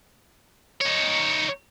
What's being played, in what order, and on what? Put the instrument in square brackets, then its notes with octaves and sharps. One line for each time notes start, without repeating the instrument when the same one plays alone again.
[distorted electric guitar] D#4 C#5